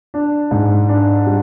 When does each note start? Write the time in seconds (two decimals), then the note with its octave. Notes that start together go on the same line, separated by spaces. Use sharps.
0.14 D4
0.51 G#2
0.89 D4
1.26 G3